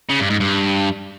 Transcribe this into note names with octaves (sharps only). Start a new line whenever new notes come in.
C#3
G2
G#2
G2